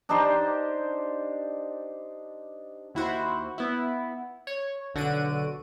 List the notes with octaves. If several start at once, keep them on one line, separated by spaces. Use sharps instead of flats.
D4 D#4 G4 C5
D#2 E4 F#4 C5
B3 E4
C#5
B1 D3 F#4 F#5 D7 D#7